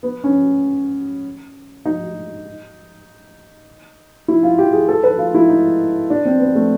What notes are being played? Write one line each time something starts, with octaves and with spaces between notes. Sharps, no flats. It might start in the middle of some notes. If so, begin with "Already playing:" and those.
B3
C#4
D#4
E4
F4
G4
G#4
A4
B4
F4
E4
D#4
D4
C4
B3
A3